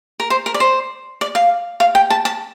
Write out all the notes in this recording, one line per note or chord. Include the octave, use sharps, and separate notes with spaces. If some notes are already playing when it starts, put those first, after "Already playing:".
A#4
C5
A#4
D5
C5
D5
F5
F5
G5
A5
A5